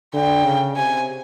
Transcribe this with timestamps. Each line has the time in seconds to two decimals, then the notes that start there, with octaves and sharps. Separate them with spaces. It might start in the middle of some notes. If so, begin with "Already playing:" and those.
0.14 D3 G5
0.45 C#3
0.77 C3 G#5